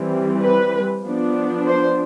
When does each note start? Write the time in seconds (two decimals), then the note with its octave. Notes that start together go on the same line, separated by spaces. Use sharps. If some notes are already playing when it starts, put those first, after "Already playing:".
Already playing: E3 G3 C4
0.42 B4
1.04 F3 B3 D4
1.66 C5